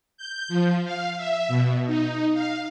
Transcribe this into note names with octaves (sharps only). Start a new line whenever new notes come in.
G6
F3
F5
E5
B2
D#4
F5